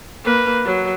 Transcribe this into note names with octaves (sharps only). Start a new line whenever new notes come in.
A#3 B4
F#3